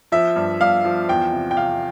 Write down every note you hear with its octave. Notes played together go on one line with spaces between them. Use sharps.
F3 E5
G2
G2 F5
F3
E2 G5
C3
G5
C3 F5